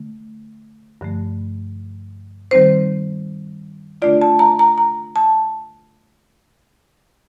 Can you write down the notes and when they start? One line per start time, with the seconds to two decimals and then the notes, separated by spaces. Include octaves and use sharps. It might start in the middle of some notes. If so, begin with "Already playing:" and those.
Already playing: D3 A3
1.01 G2 D3 F3 A3
2.51 D#3 G3 C4 D#4 C5
4.02 D3 A3 D4 F4 D5
4.21 A5
4.39 A#5
4.59 A#5
4.78 A#5
5.16 A5